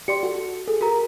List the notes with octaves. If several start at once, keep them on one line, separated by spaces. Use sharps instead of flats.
G4 D5 C6 C#7
F#4 A4
G#4 A4
F#4 A#4 A#5